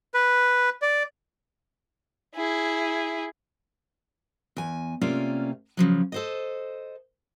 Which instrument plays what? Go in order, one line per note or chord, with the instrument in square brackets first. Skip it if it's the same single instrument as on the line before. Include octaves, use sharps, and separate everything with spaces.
[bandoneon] B4
D5
[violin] E4 G#4
[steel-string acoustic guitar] E2 G#5
C3 A3 A#3 C#4 F4 D5
C#3 F3 F#3
A4 C5 D#5